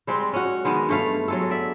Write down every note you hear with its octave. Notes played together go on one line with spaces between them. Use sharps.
G3 G#3 C4 G4
C#4 F#4
D#3 G#3 B3
G2 A3 F5
F#3 G#3 A4
D5 E5